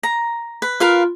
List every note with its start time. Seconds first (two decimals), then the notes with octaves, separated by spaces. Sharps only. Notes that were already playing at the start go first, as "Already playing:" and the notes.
0.03 A#5
0.62 B4
0.80 F4 A#4 B4 F5